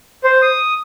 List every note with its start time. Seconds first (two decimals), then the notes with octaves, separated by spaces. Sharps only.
0.24 C5
0.42 D#6